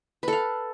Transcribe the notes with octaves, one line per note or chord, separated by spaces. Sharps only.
A4 B4 F5